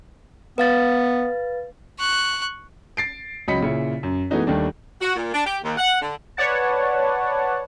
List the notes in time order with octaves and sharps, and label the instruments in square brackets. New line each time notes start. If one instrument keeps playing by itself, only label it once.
[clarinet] B3 [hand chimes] B4 F5 A6
[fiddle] C#6 F#6
[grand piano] A6 C7 D7
C#2 F#3 D#5 B5 B6 C#7
A#2 C#3 E4
F#2
E3 G#3 A3 B3 D#4 F#4
D#2 D#3 G3 A3 D4
[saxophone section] F#4
A#2
D4
G4
D#2
F#5
D3
[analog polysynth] B4 C#5 D5 F#5 A5